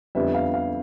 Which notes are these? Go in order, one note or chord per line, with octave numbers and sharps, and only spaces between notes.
F2 D3 G3 B3 E5
F5
F5